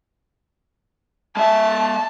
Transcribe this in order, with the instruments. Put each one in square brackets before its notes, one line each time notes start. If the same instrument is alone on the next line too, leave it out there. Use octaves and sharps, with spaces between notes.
[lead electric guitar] G#3 E5 [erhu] A5